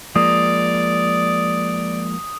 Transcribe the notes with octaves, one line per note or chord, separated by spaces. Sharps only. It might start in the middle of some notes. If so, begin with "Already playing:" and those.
F3 G#3 A#3 D5 D#6